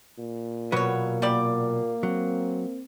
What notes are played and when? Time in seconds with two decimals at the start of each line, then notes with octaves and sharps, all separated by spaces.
0.18 A#2
0.72 B2 F#3 A#3 F#4 B4 C#5
1.22 A#2 G3 G4 D5
2.03 F#3 C4